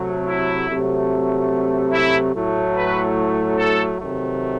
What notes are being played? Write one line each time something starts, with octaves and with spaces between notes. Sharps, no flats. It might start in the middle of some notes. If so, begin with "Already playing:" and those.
Already playing: C3 F#3 A3
E4
C3 F#3 A3
E4
A2 F#3 A3
B4
A4
C3 D#3 F#3 A3